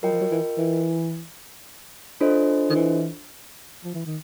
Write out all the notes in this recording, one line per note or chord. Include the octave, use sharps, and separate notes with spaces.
F#3 F4 A#4 D#5 G5
F3
F#3
E3
E3
D4 F4 A4 C5 D#5
D#3
E3
F3
E3
D#3